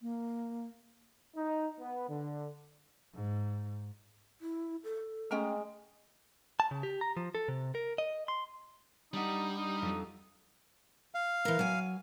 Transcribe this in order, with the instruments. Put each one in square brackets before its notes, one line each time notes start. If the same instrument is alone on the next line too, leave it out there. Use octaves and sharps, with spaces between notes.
[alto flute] A#3
[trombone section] D#4
B3
D3
[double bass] G#2
[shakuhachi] E4
A4
[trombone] G#3 [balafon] A3 [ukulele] C#4 G5 A#5
[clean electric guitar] A5
C#3
G4
A#5
F3
A4
C3
A#4
D#5
C6
[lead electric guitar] G3 [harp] D4 F#5 [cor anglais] D#4
[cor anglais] D#4
[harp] F2 F#3
[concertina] F5
[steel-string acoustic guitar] E3 A#4
F#3 G#5